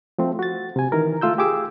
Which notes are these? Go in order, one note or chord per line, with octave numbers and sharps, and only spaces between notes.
F3 A3 C4
F#4 A6
C3 G#5
D#3 E3 A#4
A3 F4 E6 G6
G4 G#4 D6 E6